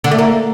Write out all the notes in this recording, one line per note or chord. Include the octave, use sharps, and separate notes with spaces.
D3
A3
A#3